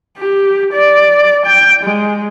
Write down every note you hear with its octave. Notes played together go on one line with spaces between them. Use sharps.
G4
D5
G5
G#3